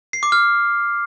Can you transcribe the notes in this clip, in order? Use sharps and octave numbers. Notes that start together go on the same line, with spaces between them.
C7
D6
F6